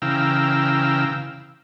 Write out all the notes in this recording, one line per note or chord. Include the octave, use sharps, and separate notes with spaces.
C#3 E3 F5 G5 A#5 E6